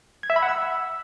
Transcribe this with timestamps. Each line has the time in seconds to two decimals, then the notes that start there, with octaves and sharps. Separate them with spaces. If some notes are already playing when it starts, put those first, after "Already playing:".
0.23 G#6
0.30 E5
0.36 B5
0.43 F#5
0.49 E6